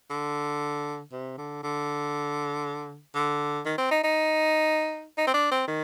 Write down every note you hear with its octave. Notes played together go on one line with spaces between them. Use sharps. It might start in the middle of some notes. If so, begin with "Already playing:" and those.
D3
C3
D3
D3
D3
D#3
C4
D#4
D#4
D#4
C4
D4
C4
D#3